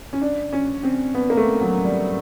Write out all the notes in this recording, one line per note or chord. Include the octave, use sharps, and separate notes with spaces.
C#4
D4
C#4
C4
B3
A#3
A3
F#3
G3